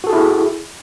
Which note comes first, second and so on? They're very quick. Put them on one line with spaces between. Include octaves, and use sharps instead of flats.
F#4 A4 G#4 E4